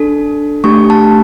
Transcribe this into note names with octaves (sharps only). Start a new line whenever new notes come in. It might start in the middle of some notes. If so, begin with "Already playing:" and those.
Already playing: D4 A4
A3 D4 G4 C#6
A5